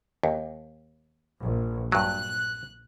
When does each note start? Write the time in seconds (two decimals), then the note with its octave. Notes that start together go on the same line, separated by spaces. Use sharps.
0.23 D#2
1.41 A#1
1.92 G2 F#3 F#6